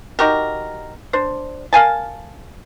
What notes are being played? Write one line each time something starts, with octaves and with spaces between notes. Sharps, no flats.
D#4 F#4 G4 A#4
D4 C5
A#4 F5 G#5 A5